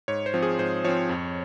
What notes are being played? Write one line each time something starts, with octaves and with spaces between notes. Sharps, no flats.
G#2 C#5
C5
F3 C4
G#4
G#2 C5
F3 C4 C#5
F2